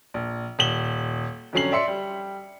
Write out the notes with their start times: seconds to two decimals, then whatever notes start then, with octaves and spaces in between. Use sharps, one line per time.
0.14 A#1
0.59 D#1 E7 F#7 G7
1.53 F2 D3 F#3 C#4 C7 F#7
1.72 D5 E5 C6 C#7
1.88 G3